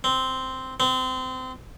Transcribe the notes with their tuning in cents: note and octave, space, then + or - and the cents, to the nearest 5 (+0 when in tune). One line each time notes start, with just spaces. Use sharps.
C4 -5
C4 -25